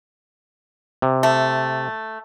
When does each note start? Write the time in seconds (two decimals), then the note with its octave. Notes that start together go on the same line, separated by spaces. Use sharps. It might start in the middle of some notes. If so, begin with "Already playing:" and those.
1.02 C3
1.23 A3